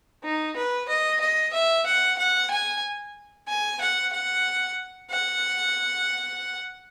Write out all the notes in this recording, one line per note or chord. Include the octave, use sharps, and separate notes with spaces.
D#4
B4
D#5
D#5
E5
F#5
F#5
G#5
G#5
F#5
F#5
F#5